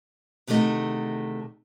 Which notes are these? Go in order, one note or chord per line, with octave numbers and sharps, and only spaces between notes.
E2 C3 D#3 A3 D#5 F#5